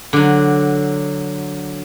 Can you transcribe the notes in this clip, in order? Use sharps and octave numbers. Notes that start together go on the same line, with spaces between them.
D3 F#3